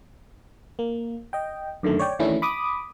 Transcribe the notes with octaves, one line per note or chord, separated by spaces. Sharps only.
A#3
D#5 G5
F#2 D3 D#3 A3
C#5 D5 G5
D#3 E3 A3 C#4 D4 E4
B5 D6 D#6